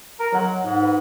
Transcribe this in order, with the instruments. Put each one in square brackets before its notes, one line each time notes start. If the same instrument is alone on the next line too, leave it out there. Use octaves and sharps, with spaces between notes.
[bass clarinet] A#4
[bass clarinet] F#3 [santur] D#5 F#5 C6
[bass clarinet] G#2 [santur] F#5
[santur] B4